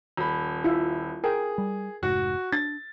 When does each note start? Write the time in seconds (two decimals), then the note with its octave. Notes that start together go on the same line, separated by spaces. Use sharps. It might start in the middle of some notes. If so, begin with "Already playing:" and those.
0.17 D#1 B5
0.64 E4 F4 E5
1.24 G#4 A#4 G5
1.58 G3
2.03 F1 G#2 F#4
2.52 D4 A6